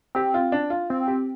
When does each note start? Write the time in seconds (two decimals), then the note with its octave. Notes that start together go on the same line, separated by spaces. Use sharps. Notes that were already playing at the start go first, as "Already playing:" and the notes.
0.15 C4 G4
0.34 F4
0.52 D4
0.70 F4
0.90 C4 F4
1.07 G4